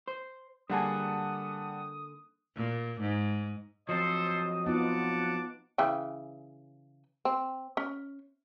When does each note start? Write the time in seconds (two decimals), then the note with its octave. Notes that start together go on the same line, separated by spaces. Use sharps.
0.08 C5
0.70 D3 G3 A#3 G#4 F#5 A5 D#6
2.56 A#2
3.01 G#2
3.89 F3 F#3 C4 A4 C5 D#5
4.66 B3 D#4 F4 F#5 A5 D6
5.78 C#3 E3 G5
7.25 C4
7.77 C#4